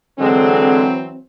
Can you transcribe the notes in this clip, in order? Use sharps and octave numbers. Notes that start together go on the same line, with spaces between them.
D3 E3 F#3 G#3 C4